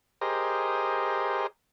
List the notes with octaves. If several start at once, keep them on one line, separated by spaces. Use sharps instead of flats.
G4 G#4 A#4 C5 D#5